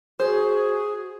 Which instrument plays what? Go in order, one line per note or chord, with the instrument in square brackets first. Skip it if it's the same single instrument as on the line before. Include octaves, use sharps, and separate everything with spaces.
[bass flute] F#4 [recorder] G#4 [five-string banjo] C5